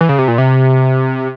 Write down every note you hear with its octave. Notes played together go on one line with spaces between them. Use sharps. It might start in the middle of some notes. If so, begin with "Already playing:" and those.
E3
C#3
C3
A#2
C3